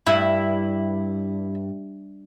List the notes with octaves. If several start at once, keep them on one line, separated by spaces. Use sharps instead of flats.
G2 E4 E5